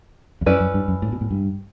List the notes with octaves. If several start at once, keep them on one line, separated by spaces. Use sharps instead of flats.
E2
F#2 C#4 E4 B4 D5
F#2
G2
F#2
A2
B2
A2
G2